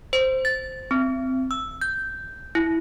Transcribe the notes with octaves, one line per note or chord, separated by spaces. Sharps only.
C5
A6
C4
E6
G6
E4